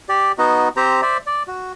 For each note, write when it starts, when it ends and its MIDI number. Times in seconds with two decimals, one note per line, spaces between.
0.09 0.32 67
0.09 0.32 74
0.38 0.69 59
0.38 0.69 63
0.38 0.69 66
0.38 0.69 75
0.76 1.01 60
0.76 1.01 67
0.76 1.01 72
0.76 1.01 82
1.02 1.17 72
1.02 1.17 74
1.02 1.17 76
1.26 1.43 74
1.47 1.73 66